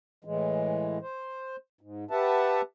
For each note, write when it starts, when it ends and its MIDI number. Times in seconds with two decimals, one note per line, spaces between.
0.25 0.98 45
0.25 0.98 52
0.25 0.98 56
1.02 1.56 72
1.81 2.05 44
2.11 2.61 67
2.11 2.61 71
2.11 2.61 76
2.11 2.61 78
2.11 2.61 81